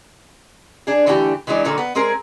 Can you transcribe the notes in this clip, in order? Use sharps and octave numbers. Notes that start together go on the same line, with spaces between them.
D4 G#4
D3 E3 A3 D4 G4
E3 F#3 G#3 D4 D#4
A#2 D3 D#3 F#3 A4
B3
G#3 C4 G#4 A#4